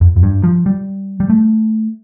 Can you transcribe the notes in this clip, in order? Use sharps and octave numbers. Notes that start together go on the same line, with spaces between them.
F2
F2
G2
F3
G3
G3
A3